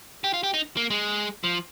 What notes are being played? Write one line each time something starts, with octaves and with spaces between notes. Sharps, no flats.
G4
F4
G4
D#4
A#3
G#3
F3